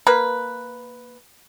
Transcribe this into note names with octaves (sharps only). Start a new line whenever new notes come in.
A#3 B4